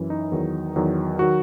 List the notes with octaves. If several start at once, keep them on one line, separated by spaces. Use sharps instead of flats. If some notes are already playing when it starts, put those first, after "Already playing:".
Already playing: F#2 E3
D#4
E2 D#3 F#3
E2 D#3 F#3
D#3 F#3 F#4